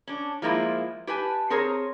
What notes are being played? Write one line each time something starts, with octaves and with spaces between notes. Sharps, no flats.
C#4 D4
F3 G#3 A#3 E4 F4
G4 B4 G#5 A5
C4 G#4 A#4 C#5